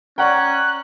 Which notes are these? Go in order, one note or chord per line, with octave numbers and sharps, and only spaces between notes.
C#4 D5 F#5 G5 A#5 C#6 F#6